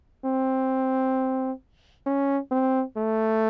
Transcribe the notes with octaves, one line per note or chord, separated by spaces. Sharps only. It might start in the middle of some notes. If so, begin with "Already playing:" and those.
C4
C#4
C4
A3